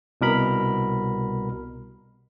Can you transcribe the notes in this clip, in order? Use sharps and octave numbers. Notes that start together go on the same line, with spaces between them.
C2 B2 A#4 B5